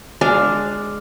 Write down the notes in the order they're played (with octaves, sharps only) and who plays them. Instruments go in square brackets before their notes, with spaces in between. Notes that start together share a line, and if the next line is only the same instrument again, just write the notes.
[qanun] G#3 D4 F5